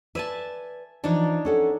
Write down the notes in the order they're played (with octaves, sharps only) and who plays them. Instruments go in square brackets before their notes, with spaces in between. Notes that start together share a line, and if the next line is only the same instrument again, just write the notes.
[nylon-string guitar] B4 D5 [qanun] E5 G#5 A5
[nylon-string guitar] E3 F3 [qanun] D4 D#4 C#5
[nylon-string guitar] C#4 A4 F#5